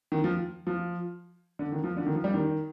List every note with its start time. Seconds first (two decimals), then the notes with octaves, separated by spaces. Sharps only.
0.12 D#3
0.24 F3
0.67 F3
1.59 D3
1.72 D#3
1.84 F3
1.97 D3
2.06 D#3
2.15 F3
2.24 G3
2.34 D#3